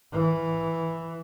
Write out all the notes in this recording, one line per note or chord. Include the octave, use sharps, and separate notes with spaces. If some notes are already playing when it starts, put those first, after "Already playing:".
E3